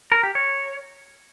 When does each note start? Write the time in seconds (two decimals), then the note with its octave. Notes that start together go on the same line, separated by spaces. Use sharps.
0.12 A#4
0.23 G4
0.35 C#5